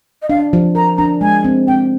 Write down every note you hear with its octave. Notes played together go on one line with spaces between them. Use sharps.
D#5
D4 F5
F3
A#4 A#5
D4 A#5
G#3 G#5
C4
C4 G5